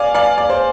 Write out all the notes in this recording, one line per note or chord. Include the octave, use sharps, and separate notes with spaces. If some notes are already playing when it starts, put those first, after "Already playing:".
Already playing: D5 F5 G#5
D5 F5
D5
C5